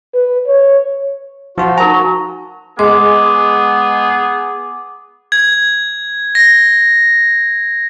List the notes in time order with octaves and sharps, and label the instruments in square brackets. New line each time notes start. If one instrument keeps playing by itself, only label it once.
[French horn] B4
C#5
[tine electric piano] F3 F4 [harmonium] F#4
[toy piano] D#4 A#4 G#5 [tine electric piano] A#5
[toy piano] A#4 C#6
[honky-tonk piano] G#3 [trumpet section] B3 G#4 [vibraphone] D6
[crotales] G#6
A#6